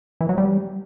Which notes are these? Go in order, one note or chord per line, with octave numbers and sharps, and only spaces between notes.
E3
F#3
G3